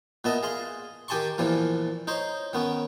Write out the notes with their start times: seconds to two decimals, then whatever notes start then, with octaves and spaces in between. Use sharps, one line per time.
0.24 A#2 B3 D#5 E5 A5
0.43 G#4 F5 C6
1.08 D#3 G4 G#5 A5 C6 C#6
1.38 E2 A#2 E3 F3
2.07 D#4 C5 C#5
2.53 D#3 B3 C#4